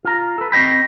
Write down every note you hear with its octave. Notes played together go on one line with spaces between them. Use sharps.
F4 A#5
A4 B4
C4 F#4 C5 D#5 G5 B5